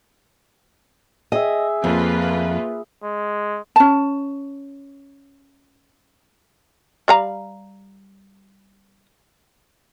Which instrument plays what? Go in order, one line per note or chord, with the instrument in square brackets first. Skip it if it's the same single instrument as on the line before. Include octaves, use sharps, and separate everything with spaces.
[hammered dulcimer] G#4 E5 [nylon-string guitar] D#5
[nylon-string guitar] F2 [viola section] A#3 F4 B4
[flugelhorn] G#3
[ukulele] C#4 A5
[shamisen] G3 F5 A#5